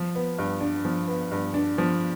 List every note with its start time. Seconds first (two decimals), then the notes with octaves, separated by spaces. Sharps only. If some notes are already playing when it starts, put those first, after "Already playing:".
Already playing: F3
0.15 B3
0.38 G2
0.61 D4
0.85 F3
1.08 B3
1.31 G2
1.54 D4
1.78 F3